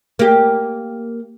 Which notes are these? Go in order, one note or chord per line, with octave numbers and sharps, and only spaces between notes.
A#3 G4